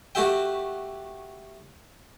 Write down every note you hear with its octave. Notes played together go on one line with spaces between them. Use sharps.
A3 F#4 G4 E5 G5